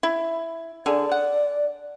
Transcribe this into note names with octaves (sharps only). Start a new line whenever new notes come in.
E4
D3 G#4 D5
F#5